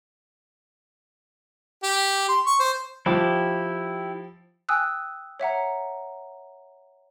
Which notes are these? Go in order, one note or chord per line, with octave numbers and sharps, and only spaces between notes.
G4
C6
C#6
C5
F3 E4 G4 D6
G5 G#5 D#6 E6 F#6
C#5 E5 F#5 A#5